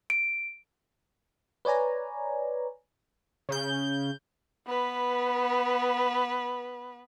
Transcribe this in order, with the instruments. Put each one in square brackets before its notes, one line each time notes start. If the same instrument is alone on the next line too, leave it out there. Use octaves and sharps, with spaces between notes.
[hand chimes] D7
[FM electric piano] B4 C#5 D5 G#5 A#5
[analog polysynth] C#3 G6
[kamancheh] B3 B4